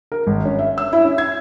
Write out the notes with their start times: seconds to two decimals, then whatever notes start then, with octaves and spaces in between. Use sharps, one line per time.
0.12 A#4
0.27 G#1
0.45 C#4
0.59 E5
0.78 E6
0.93 E4
1.04 C#4
1.18 G#6